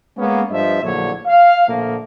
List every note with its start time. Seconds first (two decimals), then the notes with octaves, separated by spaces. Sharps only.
0.17 G#3 A#3 B3 C#4
0.50 G2 F3 D#5 E5
0.82 A#1 A2 D3 F#3 C#5
1.26 F5
1.68 A#2 D3 F3 A3 A#3